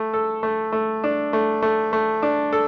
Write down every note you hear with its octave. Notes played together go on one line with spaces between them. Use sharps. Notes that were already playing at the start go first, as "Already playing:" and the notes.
Already playing: A3
A4
A3
A3
D4
A3
A3
A3
D4
A4